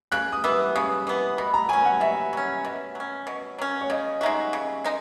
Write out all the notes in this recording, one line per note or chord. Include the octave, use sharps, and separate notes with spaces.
C#3 F#6
D#6
E3 B3 E6
C#3 D#6
E3 B3
B2 B5
A#5
F#3 C#4 G#5
F#5
B2 E5
F#3 C#4
B2
F#3 C#4
B2
F#3 C#4
C#5
C#3 D#5
G#3 D#4 F#4 E5
C#3
G#3 D#4